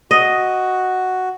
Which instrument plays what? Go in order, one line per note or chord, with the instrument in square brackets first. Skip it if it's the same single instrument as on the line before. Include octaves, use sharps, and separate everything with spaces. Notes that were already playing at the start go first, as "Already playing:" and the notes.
[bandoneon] F#4 [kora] D#5